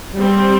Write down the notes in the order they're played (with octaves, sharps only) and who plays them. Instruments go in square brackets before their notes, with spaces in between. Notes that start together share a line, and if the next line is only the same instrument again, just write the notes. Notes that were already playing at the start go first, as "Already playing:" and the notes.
[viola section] G3 C4